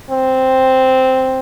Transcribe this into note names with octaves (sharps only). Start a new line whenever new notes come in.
C4